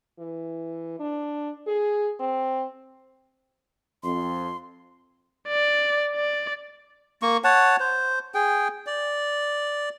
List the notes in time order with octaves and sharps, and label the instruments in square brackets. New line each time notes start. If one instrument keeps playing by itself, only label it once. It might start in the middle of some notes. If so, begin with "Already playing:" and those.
[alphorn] E3
D4
G#4
C4
[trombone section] F2 [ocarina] C6
[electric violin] D5
D5
[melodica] A#3 C#6
C#5 F#5 A5
C5
G#4 G5
D5